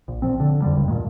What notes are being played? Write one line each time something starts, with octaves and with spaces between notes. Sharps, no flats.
A#1
A#1 F3 C4
D3
F2 D3 G3
F#1 C#2
G2 A#2 D#3 G#3